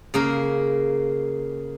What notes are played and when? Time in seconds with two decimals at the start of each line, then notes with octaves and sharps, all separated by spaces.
0.14 C#3 A#3 A#4